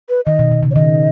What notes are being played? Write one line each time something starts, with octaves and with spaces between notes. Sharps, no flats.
B4
D#3 D#5
B2
B2
C#3
C#5
D#3 D#5